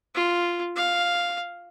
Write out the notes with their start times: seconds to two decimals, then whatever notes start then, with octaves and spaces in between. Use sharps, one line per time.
0.14 F4
0.76 F5